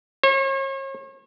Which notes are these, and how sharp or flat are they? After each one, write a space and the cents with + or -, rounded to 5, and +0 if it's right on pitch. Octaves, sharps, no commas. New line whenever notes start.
C#5 -40